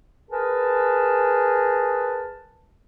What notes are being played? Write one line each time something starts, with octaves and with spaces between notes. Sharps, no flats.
G#4 A#4 B4 A5